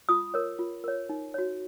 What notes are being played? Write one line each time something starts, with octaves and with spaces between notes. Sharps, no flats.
F4 D#6
A#4 C#5
F4
A#4 C#5
D#4
F#4 C#5